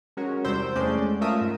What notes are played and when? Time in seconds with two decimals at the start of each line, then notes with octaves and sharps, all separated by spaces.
0.17 G#3 C#4 F#4 A#4
0.44 E2 C3 G3 C5 G5 E6
0.75 E2 G#3 A3 C#4 D5 G6
1.21 A3 C#4 F4 A#4 E5 D#6
1.41 G#2